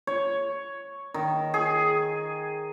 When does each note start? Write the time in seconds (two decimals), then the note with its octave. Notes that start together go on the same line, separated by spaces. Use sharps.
0.07 C#5
1.14 D#3
1.54 G#4